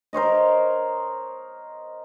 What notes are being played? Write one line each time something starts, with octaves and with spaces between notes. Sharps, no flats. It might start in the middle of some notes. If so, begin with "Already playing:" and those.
A#4 C5 C#5 D#5